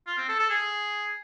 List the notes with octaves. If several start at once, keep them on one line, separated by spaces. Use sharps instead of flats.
F4
C4
A4
A4
G#4